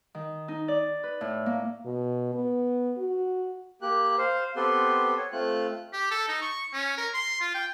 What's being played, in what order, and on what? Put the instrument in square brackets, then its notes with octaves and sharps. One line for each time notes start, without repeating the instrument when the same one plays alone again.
[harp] D#3
D#4
D5
B4
A2
A#3
[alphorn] B2
B3
F#4
[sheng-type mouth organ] A#3 G4 F#6
C5 F5
B3 C4 G4 A4 B4 C6
C#5
A3 C4 F4 F#6
[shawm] G4
A4
D#4
C#6
C#4
A#4
C6
F4
G5